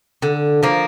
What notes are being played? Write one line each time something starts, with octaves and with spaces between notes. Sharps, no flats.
D3
F3 A#3